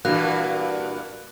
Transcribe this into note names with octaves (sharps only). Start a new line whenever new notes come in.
G2 A#2 E3 A#3 F#4 B4 F#6